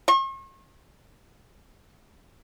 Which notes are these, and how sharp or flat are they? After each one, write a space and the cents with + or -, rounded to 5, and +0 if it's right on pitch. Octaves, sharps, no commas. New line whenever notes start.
C#6 -45